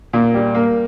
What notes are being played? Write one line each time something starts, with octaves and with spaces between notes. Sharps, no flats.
A#2
G3
A#3